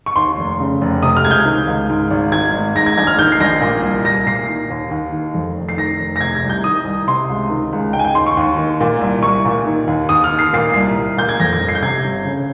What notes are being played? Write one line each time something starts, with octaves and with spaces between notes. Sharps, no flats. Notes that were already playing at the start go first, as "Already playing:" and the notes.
C#6
D#2 C6
F1
C#3
F1
C3 D#6
F6
C#2 G#6
G6
D#3
C#2
G#2
G#1
D#3 G#6
G#1
G#2 A#6
G#6
A#1 G#6
F6
D#3 G6
C7
A#1 A#6
A#2
C2
C2 A#6
A#2 C7
D#3
D#2
D#2
D#3
F2
F1
C7
D#3 A#6
F1
A#6
C3 G#6
G#6
C2
G6
D#3 D#6
C2
C3 C6
C#2
D#3
C#2
D#3 G5
G#5
G5
D#2 C6
C#6
D#2
D#3
A#2
C2
C2 C#6
A#2
D#3
D#2
D#2 D#6
F6
D#3
C7
A#2 C7
C2
C2
A#2 G6
G#6
F2 A#6
G#6
G1
C7
G6
C3 G#6
G1
C#3